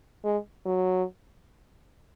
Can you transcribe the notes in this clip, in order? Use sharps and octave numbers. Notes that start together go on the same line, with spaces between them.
G#3
F#3